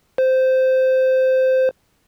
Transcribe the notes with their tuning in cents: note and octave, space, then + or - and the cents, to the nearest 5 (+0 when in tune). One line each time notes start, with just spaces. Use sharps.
C5 -10